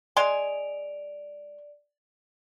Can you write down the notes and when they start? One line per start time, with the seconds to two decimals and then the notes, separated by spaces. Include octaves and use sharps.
0.17 G#3 D5 G#5 C6 D7 F7